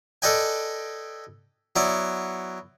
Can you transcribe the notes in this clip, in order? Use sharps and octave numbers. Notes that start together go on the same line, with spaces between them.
A4 B4 D5 D#5 G5 G#5
F#3 B3 E4 D5